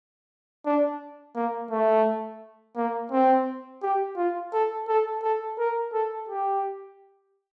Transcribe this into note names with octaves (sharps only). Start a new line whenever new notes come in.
D4
A#3
A3
A#3
C4
G4
F4
A4
A4
A4
A#4
A4
G4